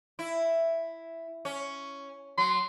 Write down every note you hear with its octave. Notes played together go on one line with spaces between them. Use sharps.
E4
C#4
F#3 C6